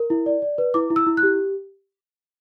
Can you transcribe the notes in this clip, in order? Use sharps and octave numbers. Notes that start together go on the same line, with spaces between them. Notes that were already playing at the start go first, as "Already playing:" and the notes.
Already playing: A#4
E4
D5
D5
B4
E4 D6
E4
E6
E4
F#6
G4